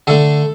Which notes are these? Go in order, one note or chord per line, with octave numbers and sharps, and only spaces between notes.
D3 A3 A4